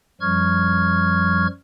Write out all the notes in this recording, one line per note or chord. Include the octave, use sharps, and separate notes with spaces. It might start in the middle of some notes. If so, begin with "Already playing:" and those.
F#2 F3 G3 C#6 F6 G#6